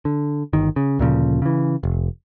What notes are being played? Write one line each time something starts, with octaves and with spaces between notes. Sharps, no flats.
D3
G1 D#3
C#3
D2 A#2 C#3 F3
C#3 E3
F1